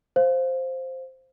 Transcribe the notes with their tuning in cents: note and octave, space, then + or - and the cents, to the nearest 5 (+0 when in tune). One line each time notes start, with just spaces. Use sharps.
C5 +0 F5 +0